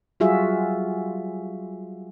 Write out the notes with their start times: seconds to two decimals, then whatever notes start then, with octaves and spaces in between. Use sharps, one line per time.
0.20 F#3 G3 F4 F#4 G#4 E5